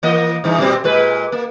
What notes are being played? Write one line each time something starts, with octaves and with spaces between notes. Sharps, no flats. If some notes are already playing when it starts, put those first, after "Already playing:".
E3 A#3 D#5
G2 E3 D#4
A#2 G3 C4
A#2 G#3 B4
A#3